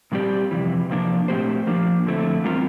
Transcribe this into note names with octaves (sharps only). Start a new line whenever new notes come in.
A#2 G3 C4 G4 D5
F2 C3 E3
C3 F3 A#3 D4
A#2 A3 C4 G4 C5
F3 A#3 D4
F2 D3 A3 C4 E4
E3 G3 C4 F4 A#4